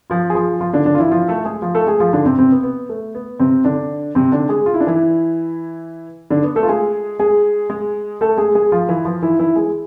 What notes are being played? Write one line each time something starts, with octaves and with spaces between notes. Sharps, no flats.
F3 F4
G#4
F3 F4
F3 F4
D3 D4
D3 D4
F4
E3 E4
F3 F4
A3 A4
G#3 G#4
F3 F4
A3 A4
G#3 G#4
F3 F4
D3 D4
C3 C4
C3 C4
B3
B3
A3
B3
C3 C4
D3 D4
C3 C4
D3 D4
G#3 G#4
F4
E4
D4
E3 E4
D3 D4
B3
A3 A4
F4
G#3 G#4
G#3 G#4
G#3 G#4
A3 A4
G#3 G#4
G#3 G#4
F3 F4
E3 E4
F3 F4
E3 E4
E3 E4
G#3 G#4